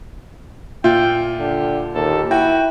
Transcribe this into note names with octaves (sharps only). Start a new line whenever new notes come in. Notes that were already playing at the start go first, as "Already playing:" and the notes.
A#2 F4 E5 G5
D3 G4
D#2 A4
E4 F#4 G5